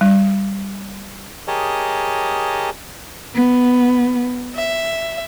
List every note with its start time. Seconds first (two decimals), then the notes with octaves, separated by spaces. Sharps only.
0.01 G3
1.48 G4 G#4 A#4 C#5 D#5 A5
3.35 B3
4.55 E5